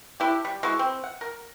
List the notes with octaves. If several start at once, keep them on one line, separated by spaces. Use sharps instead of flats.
D4 E4 G4
G3
G#3 E4 F#4
C4
F#5
A#4